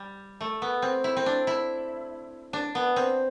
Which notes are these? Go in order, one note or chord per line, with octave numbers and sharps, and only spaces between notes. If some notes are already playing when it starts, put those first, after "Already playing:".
Already playing: G3
A3
B3
C4
E4
C4
D4
E4
D4
B3
C4